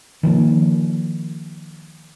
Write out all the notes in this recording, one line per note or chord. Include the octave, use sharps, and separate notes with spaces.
D#3 F3 G#3 A#3